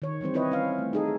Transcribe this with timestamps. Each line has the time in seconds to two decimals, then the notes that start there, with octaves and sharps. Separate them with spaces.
0.02 D#3 C#5
0.21 E3 G3 C4 C5
0.34 C4 E4 B4 C#5 D#5
0.52 C#4 F5
0.79 A3
0.93 D#4 G#4 A4